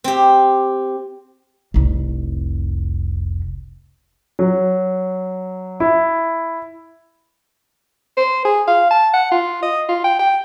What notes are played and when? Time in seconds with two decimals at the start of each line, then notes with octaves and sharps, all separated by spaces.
0.04 C4 G4
1.74 F1 C2
4.39 F#3
5.80 E4
8.17 C5
8.45 G#4
8.68 F5
8.91 A5
9.14 F#5
9.32 F4
9.62 D#5
9.89 F4
10.04 G5
10.19 G5